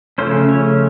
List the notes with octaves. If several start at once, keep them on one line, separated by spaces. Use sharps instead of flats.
C#3 F3 A3 C#4 C5
C#5